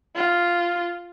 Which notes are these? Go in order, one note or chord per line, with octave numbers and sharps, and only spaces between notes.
F4